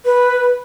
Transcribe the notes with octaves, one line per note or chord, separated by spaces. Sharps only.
B4